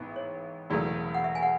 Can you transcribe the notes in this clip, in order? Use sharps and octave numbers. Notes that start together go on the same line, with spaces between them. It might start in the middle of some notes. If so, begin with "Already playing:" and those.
Already playing: A1 G#2 B3
C#5
E1 E2 C#3 F#3 A3 D5
F#5
E5
G#5
F#5